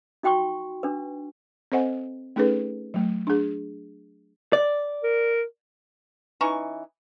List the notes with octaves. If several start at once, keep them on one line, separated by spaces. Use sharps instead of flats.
D#4 F#4 G5 C6 C#6
D4 B4
C4 A4 C5 D#5 F#5 G#5
A3 C#4 D#4 G#4 A4 B4
F#3 A3
D4 G#4
D5
A#4
E3 C#4 D#4 C#6